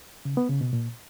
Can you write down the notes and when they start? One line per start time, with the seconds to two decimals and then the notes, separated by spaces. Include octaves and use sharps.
0.25 C#3
0.37 B3
0.49 C#3
0.61 B2
0.73 A#2